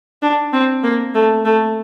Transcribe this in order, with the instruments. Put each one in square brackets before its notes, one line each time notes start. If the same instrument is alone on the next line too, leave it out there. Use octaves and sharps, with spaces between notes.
[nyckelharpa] D4
C4
A#3
A3
A3